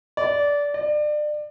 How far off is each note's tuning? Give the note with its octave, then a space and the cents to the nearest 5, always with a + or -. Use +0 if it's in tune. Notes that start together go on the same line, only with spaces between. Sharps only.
D5 -20
D5 +30